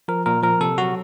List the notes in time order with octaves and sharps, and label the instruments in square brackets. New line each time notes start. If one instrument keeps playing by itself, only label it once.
[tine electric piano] F3 A#4
A#2 A#4
F3 A#4
C3 A4
F#3 F#4